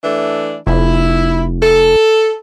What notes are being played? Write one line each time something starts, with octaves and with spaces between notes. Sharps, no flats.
E3 A3 D4
F1 E4
A4